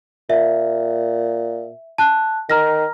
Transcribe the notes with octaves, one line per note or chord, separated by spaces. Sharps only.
A#2 E5
A5 F#6
D#3 A#5 F6 A#6